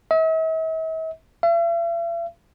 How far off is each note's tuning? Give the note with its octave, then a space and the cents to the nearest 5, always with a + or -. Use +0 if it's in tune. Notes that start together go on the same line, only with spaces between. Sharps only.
E5 -45
E5 +45